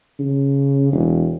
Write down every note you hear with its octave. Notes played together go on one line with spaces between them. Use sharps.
C#3
E1